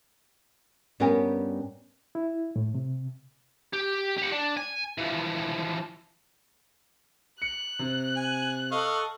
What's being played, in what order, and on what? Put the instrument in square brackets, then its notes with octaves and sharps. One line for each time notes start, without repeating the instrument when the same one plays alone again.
[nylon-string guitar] G2 B3 C#4 G4 A#4 G#5
[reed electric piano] E4
A2
C3
[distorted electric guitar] G4
G4 F#5
D4
G#5
E3 F3
[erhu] F#6 [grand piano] C#7
[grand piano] C3
[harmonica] G#5
[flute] A4 [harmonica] D#5 F5 C#6